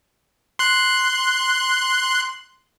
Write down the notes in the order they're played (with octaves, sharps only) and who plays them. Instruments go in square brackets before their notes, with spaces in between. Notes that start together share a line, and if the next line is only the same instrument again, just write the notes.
[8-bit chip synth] C6 F#6